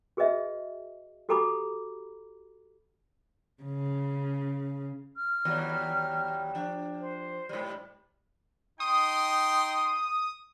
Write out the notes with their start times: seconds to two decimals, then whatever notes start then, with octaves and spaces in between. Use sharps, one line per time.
0.17 F#4 G#4 B4 D#5 E5
1.29 F#4 G4 A4 A#5 B5 D6
3.63 C#3
5.16 F6
5.45 D#2 F#3 G3
6.55 F3 D4
7.01 C5
7.49 G#2 G3
8.80 D#4 G5 C6 D#6